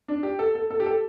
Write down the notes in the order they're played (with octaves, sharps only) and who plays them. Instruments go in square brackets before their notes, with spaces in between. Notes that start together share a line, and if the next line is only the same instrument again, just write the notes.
[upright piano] D4
G4
A4
A4
A4
G4
A4